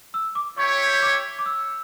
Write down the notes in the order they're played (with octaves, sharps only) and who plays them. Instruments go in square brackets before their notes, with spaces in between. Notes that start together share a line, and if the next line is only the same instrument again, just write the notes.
[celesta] E6
D6
[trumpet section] E4 G4 C#5 G5 [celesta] C#6
[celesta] D6
D6
E6